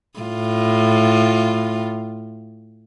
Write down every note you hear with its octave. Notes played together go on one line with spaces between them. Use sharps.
A2 F4